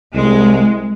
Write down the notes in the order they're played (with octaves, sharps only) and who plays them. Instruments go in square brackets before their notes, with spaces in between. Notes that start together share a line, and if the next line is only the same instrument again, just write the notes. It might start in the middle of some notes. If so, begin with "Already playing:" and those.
[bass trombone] C2 [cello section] G#3